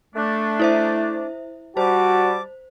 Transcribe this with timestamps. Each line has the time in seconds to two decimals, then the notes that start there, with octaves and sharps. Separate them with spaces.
0.15 A3 D4
0.60 E4 C5 E5
1.77 G3 F#4 C5 A5 D6